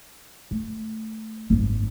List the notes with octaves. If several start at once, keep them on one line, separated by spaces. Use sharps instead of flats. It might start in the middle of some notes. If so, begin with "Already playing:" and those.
A3
G#1 F#2